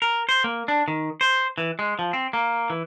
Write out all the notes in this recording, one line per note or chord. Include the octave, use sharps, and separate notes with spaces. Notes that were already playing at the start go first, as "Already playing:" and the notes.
A#4
C5
A#3
D4
D#3
C5
E3
G#3
F3
C4
A#3
E3